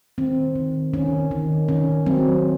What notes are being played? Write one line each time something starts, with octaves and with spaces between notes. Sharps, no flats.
D#3 C4
D#3
D#3 C#4
D#3
D#3 C#4
F#3 C4